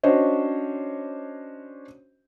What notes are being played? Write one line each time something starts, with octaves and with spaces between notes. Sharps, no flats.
C#4 D4 F#4 C5 C#5 D#5